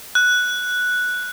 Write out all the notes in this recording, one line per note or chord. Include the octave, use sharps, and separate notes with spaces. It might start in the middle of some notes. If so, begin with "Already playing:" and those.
F#6